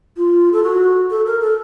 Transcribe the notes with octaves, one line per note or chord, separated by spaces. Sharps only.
F4
A4
F#4
A4
A#4
A4